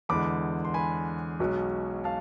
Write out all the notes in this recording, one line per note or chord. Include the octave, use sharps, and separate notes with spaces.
E2 D3 G#3 B5 D6
C6
G#5 B5
B1 B2 G#3
F5 A5